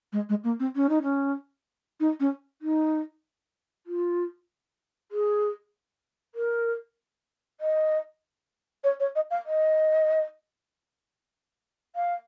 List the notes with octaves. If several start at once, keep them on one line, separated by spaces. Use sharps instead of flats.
G#3
G#3
A#3
C4
C#4
D#4
C#4
D#4
C#4
D#4
F4
G#4
A#4
D#5
C#5
C#5
D#5
F5
D#5
F5